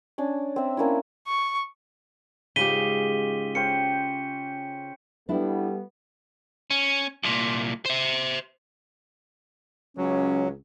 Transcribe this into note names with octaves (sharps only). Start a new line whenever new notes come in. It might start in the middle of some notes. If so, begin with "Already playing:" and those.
C#4 D4
C4 E5
A#3 C#4 D4 E4
C#6
G#2 C#3 F4 G4 D6 B6 D#7 G7
C#4 C5 G5 C#7
G3 A3 B3 D4 E4
C#4
C2 A#2
C5 E5
C#2 F#3 C#4